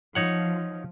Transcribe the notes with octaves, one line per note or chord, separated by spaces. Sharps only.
F3 D#4 C#5 F#5